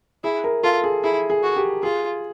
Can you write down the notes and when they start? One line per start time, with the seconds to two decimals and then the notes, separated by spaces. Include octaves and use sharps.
0.24 E4 G#4
0.44 A#4
0.63 F4 A4
0.84 G#4
1.03 E4 G#4
1.30 G#4
1.43 F#4
1.56 G4
1.83 F4 G#4